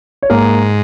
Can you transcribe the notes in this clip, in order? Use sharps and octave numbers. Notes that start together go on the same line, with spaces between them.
C#5
G#2 A#3 A#4